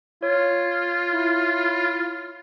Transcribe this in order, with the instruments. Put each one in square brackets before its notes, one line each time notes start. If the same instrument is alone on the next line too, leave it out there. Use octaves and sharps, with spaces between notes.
[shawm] F4 [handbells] C#5
[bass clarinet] E4